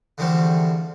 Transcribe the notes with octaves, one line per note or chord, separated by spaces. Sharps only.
E2 D3 F3 G3 A3 C4